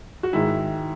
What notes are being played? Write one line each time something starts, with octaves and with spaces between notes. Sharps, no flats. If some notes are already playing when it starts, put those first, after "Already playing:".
F#4
G#2 D#3 G#3 E4